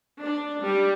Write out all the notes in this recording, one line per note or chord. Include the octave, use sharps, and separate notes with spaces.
D4
G3